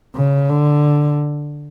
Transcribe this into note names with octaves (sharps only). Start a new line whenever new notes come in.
C#3
D3